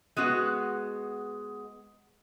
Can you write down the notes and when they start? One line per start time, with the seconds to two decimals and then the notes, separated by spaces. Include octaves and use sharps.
0.17 G#3 B3 F#4